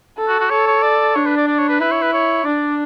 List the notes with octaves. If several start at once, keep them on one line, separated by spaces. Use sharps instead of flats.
A4
F#4
F#4
A4 C#5
C#5
D5
D4 C#5
B4
D5
D5
C#5
B4
E4 B4
C#5
B4
C#5
D4 D5